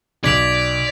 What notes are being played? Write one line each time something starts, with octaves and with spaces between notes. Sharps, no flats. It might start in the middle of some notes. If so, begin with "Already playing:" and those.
B1 D5 G#6 B6 F7